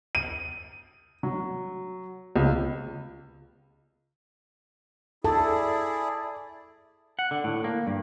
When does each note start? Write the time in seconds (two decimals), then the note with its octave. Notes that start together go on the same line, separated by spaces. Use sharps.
0.15 D#7
1.23 F#3
2.36 C#2
5.24 E4 G#4 A4 D5 A5
7.19 F#5
7.31 D3
7.44 A2
7.64 A#3
7.87 G2